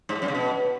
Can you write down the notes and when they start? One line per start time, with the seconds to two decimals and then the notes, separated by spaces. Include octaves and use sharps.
0.09 G#2
0.15 A2
0.22 F#2
0.28 C#3
0.35 B2